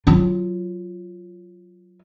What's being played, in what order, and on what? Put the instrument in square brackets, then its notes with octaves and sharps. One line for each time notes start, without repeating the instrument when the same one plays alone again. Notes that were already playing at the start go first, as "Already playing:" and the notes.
[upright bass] F#3 F4